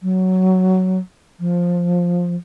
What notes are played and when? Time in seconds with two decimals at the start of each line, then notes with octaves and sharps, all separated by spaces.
0.03 F#3
1.40 F3